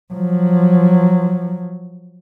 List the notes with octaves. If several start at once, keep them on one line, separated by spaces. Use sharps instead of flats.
F3 F#3